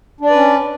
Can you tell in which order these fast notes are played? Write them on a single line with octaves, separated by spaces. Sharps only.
D4 D5 B4 C#4